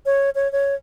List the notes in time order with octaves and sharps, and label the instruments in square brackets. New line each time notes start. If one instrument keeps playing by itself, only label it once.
[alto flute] C#5
C#5
C#5